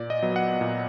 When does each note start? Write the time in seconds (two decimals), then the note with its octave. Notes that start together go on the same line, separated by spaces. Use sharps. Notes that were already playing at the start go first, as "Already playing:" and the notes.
Already playing: A#2 D5
0.10 D#5
0.23 F#3 B3
0.36 F#5
0.61 A#2